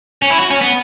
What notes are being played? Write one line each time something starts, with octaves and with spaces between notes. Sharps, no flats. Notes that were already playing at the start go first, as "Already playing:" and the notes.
C#4
E4
F#4
C#4
B3